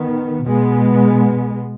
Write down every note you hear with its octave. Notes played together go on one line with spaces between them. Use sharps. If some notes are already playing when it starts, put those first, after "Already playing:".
Already playing: D#3 B3
B2 G#3 B3